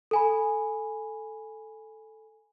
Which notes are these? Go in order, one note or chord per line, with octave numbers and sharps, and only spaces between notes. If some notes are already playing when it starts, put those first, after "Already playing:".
A4 G#5 B5